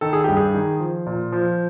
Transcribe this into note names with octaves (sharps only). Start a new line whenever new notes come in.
D#3 A4
G#4
G2 G4
G#4
D#3
F3
A#2
F3